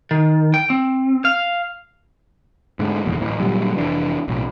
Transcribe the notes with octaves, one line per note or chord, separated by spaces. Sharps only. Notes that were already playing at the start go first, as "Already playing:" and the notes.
D#3
G5
C4
F5
G#2 D3 A3
F1 A#1 E2
D1 A1 E3
A#2 D3 F#3 G3
F1 E3 D4
B1 A2